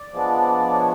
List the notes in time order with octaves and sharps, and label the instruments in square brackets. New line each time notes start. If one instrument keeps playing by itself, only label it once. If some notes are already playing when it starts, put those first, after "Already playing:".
Already playing: [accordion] D5
F3 G#3 B3 D4
C#5